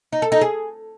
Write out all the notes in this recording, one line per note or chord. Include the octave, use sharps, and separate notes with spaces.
D#4
A4
D#4
G#4